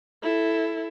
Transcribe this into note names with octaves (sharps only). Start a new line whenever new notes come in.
E4 A4